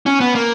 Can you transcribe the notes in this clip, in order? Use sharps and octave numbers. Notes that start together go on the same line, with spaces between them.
C#4
B3
A#3